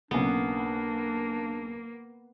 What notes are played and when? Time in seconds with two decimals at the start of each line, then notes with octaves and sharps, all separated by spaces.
0.11 B1 C#3 A#3 B3 D4 G#4